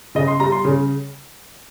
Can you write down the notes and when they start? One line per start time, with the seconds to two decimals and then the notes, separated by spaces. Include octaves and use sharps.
0.15 C#3 D#5
0.28 C6
0.40 G3 A#5
0.52 C6
0.65 C#3